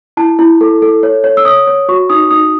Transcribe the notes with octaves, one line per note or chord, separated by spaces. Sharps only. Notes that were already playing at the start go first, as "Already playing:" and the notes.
E4 A5
E4
A4
A4
C#5
C#5
E6
C#5 D#6
C#5
F#4 C#6
D#4 D#6
D#4 D#6